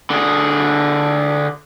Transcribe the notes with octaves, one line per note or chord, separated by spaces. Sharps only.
D3 G#4